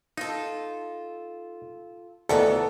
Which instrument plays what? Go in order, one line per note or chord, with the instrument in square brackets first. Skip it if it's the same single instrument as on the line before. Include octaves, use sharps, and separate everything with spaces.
[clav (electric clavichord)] D#4 [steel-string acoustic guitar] F4 A4
[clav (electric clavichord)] D2 [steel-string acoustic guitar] D#3 E3 B3 [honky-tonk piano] A4